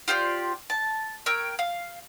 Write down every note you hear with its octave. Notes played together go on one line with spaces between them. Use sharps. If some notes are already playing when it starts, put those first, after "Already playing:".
F4 G4 C5 D5
A5
A#4 C#5 G5 E6
F5